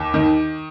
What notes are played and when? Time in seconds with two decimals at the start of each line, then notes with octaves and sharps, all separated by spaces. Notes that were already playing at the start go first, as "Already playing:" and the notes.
Already playing: D#2 D6
0.14 D#3